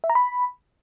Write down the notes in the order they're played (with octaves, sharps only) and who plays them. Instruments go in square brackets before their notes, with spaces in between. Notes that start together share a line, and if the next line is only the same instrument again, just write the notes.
[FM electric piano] E5
A#5
B5